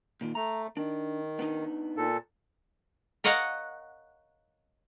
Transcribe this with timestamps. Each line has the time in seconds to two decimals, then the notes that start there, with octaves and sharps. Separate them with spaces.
0.21 A#2 D#3 F4
0.35 A3 A#5
0.77 D#3 D4
1.39 B3 D4 D#4
1.97 A#2 A4
3.24 A#4 C#5 D#5 F5 F#5